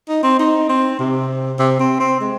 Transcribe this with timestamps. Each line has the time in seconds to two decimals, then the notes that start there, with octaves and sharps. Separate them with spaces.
0.09 D#4
0.23 C4
0.39 D#4
0.69 C4
0.99 C3
1.59 C3
1.80 C4
2.00 C4
2.20 G#3